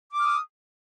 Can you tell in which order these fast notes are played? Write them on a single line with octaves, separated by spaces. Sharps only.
D6 F6 D#6